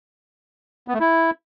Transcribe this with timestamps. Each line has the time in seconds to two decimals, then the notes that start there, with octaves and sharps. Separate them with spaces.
0.88 B3
0.94 A3
1.00 E4